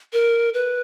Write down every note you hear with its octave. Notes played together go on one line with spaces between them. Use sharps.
A#4
B4